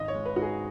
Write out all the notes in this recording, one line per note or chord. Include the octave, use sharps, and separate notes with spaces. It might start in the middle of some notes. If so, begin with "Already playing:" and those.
Already playing: G#1 D#5
C#5
G#3
B4
G#2 F#4
G#4